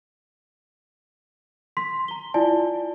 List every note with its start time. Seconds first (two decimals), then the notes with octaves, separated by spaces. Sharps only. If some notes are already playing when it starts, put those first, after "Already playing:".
1.77 C6 B6
2.08 A#5 G7
2.34 E4 F4 D5 G#5 A5